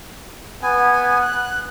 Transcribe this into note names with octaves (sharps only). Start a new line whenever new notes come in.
B3 G#5
F#6